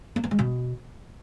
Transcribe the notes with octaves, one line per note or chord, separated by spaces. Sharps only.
A#3
B3
G#3
B2